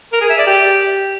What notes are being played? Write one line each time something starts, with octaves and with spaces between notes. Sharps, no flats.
A#4
G#4
E5
D5
G4